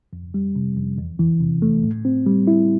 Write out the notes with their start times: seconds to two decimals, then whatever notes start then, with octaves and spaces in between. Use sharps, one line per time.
0.13 F2
0.34 G3
0.55 C3
0.77 F2
0.98 E2
1.19 E3
1.41 C3
1.62 A3
1.83 A2
2.05 C4
2.26 G3
2.47 E4